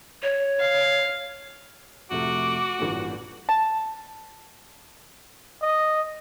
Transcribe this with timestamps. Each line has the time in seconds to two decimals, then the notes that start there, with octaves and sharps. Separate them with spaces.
0.23 C#5
0.59 F5
2.11 F2 C3 A3 F#4 D6
2.79 A1 G2 A#2
3.49 A5
5.62 D#5